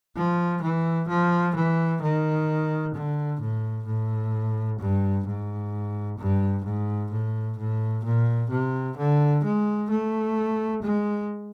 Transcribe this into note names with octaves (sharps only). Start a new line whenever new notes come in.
F3
E3
F3
E3
D#3
D3
A2
A2
G2
G#2
G2
G#2
A2
A2
A#2
C3
D3
G#3
A3
G#3